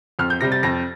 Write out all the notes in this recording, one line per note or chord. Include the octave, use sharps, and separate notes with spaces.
F2 F6
G6
C3 G3 A#6
A6
F2 A#6